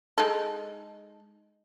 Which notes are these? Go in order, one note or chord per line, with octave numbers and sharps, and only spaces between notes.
G#3 D#4 A4